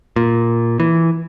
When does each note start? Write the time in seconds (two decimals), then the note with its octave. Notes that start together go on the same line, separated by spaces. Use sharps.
0.16 A#2
0.80 E3